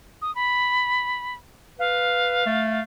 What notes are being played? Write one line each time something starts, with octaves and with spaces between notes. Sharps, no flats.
D#6
B5
B4 F5
A3